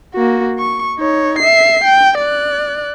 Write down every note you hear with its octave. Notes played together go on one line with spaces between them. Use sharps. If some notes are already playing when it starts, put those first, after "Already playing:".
A#3 F#4
C#6
D#4 C#5
E5 C7
G5
D5 F#6